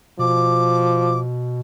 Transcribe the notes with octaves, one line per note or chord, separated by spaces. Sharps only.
B2 F3 D6